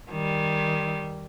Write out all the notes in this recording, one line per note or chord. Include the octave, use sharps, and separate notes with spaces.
D#3 G3